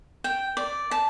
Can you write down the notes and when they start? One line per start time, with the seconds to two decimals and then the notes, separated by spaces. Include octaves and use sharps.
0.24 G5
0.57 D5
0.91 A5